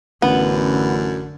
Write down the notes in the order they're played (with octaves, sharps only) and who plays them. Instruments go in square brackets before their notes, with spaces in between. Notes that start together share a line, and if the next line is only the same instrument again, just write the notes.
[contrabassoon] A1 [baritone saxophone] F#2 [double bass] D3 [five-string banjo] B3